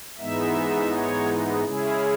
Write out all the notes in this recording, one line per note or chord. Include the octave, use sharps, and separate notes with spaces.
G#2 E3 G#3 B3 D#4 E5
C#5
C#3 G#3 C#4 E4 G#4